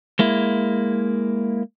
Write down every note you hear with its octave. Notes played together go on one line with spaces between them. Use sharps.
G#3 A#3 E4